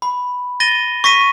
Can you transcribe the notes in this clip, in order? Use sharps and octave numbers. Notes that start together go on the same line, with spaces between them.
B5
A6 A#6 D#7 G7
C#6 A#6 B6 D#7